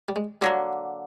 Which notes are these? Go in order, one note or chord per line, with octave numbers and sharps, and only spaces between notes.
G3
G#3
D3 F#3 G3 A#3